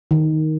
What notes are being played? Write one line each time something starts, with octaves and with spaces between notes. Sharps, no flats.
D#3